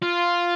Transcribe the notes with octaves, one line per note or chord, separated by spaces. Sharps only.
F4